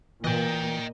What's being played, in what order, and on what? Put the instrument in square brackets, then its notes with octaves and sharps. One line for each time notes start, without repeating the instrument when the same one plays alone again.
[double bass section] A#2 [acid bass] E3 [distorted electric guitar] D#5 G5